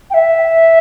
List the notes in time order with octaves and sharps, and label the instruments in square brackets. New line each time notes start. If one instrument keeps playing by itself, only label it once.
[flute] G5
E5